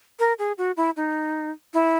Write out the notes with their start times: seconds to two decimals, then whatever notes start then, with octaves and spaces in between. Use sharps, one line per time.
0.19 A#4
0.39 G#4
0.58 F#4
0.77 E4
0.96 D#4
1.74 E4